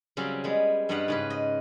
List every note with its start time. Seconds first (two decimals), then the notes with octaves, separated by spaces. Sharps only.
0.17 C#3 F#3 G3 C4 C#4
0.44 G3 G#3 B3
0.89 G2 G3 B4 D#5 F5 F#5
1.08 G#2 C#3 B4
1.30 D#5